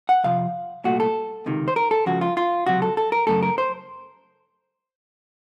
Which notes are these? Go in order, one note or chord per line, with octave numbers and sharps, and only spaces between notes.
F#5
F2 C3 F3 F5
C2 A#2 A3 F#4
A4
C#2 C3 D#3
C5
A#4
A4
C#2 C#3 F3 F#4
F4
F4
C#2 C3 F#3 F#4
A4
A4
A#4
F#2 C#3 A3 A4
A#4
C5